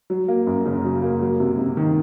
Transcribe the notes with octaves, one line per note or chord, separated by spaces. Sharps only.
F#3
A#3
F#2
C#3
F#3
A#3
F#3
C3
C3
D#3